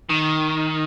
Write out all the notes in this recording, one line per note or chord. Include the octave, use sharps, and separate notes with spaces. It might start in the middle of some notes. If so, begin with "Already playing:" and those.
D#3